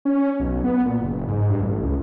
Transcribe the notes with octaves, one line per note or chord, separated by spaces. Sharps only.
C#4
B1
B3
A#2
F#1
G#2
G2
A1
C#2